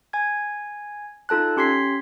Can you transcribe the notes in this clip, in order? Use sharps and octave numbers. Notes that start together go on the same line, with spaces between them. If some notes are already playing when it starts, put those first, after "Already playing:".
G#5 G#6
D#4 F4 A4 A5 F#6
C#4 G4 C6 G#6 B6 C7